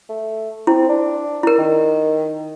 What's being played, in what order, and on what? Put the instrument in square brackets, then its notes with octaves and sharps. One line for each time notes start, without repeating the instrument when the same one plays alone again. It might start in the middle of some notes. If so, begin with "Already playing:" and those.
[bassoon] A3
[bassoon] C4 [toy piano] E4
[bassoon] D4
[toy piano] E4 A#4
[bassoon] D#3